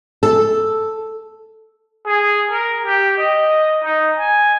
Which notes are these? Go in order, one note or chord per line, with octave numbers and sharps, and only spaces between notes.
A4
G#4
A#4
G4
D#5
D#4
G#5